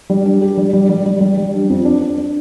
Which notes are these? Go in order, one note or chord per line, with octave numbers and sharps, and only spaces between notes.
G3
D4
G4
G3
G3
G3
G3
G3
G3
D4
F2
D4
D4
D4